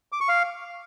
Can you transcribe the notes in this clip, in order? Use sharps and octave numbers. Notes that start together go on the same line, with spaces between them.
D6
C#6
F5